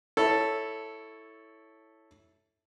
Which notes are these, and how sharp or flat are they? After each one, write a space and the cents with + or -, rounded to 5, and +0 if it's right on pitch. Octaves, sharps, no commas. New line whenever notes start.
E4 -10 A4 +0 C#5 +0